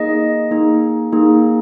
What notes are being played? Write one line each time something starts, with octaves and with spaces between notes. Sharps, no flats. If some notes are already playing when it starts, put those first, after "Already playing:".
Already playing: A#3 D#4 G#4 D#5
A#3 D#4 G#4
A#3 D#4 G#4